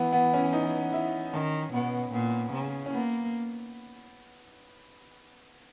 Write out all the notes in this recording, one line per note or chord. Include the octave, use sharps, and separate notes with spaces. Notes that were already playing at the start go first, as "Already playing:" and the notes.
Already playing: E3 B3
B3
C#4
D#4
E4
D#3 C#4
B2 B3
A#2 B3
C#3
C#4
A#3 B3